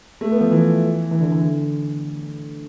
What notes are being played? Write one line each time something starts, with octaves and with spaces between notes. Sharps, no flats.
A3
B3
F3
E3
E3
D3
E3
D3